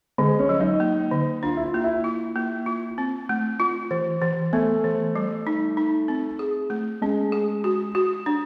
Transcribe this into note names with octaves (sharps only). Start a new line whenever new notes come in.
D3 G#3
C#4
F#3
D#4
A#3
D3
D4 F4
E4
F4
A#3
E4
F4
A#3
F4
C4
A3
F4
E3
E3
A3 B3
E3
G3
D#4
D#4
C4
G#4
A3
G#3 C#4
G#4
F#4
F#4
D4